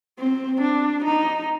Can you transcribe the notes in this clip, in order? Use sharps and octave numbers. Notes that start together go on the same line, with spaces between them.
C4
D4
D#4